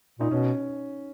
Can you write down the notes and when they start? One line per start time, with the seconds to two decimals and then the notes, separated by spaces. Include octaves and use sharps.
0.19 A#2 D#4
0.31 B2 C#4